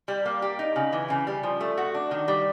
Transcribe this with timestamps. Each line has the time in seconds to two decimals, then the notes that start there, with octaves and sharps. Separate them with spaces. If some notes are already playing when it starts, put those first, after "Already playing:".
0.08 G3
0.25 A#3
0.42 G4
0.59 D#4
0.76 C#3
0.93 E3
1.10 C#3
1.27 G3
1.43 F3
1.61 A3
1.78 F#4
1.95 D4
2.11 D#3
2.28 G3